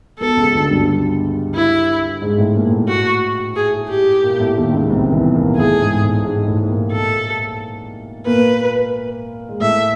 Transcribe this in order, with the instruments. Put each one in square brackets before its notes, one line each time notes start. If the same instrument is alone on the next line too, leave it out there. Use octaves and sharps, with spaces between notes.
[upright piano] B1 B2 [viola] A4
[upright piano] C#2 C#3
D2 D3
G2 G3
[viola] E4
[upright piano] G#2 G#3
A2 A3
A#2 A#3
A2 A3
[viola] F#4
G#4
G4
[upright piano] A#2 A#3
A2 A3
D#2 D#3
C#2 C#3
C2 C3
E2 E3
A#2 A#3
[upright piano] A2 A3 [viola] G#4
[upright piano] G#2 G#3
A2 A3
G#2 G#3
A2 A3
A#2 A#3
[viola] A4
[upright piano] A#2 A#3 [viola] B4
[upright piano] G#3
[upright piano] A2 A3 [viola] E5